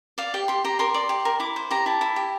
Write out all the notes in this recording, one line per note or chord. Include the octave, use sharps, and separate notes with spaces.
D5 F5
G4 G5
G4 C6
G4 A#5
A#4 C6
D5
G4
A#4
E4 D6
C5
G4 A#5
E4 A5
E4
G4